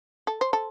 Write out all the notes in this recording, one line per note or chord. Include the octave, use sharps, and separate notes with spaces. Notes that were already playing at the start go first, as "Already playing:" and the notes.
A4
C5
A4